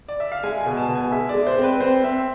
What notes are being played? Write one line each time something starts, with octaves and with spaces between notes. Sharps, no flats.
D5
E5
F5
G#3 G#5
G#5
B2
A5
B2
G#5
G#3 E5
D5
G#3
C5
C4
B4
C4 C5
C4 E5